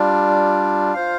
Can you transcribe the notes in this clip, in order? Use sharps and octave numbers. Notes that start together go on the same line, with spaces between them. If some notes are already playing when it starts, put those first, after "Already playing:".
Already playing: G3 D4 F4
F4 C5 F5